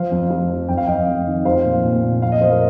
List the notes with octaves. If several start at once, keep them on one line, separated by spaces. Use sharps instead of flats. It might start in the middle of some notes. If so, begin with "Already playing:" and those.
Already playing: F3 C5 F5
F2
F3
F3
F2 G5
F5
F2 D#5 G5
F2
D#3
F3 C5 F5
A#2
A#2
A#2
F2 F5
D#5
F3 C5
A#4 D#5